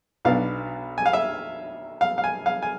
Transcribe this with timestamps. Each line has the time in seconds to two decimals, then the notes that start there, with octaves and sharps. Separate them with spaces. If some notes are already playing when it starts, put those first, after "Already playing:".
0.25 B1 B2 B3 D4 F5
0.98 G#5
1.06 F5
1.13 E5
2.01 F5
2.18 F5
2.24 G#5
2.46 F5
2.62 G#5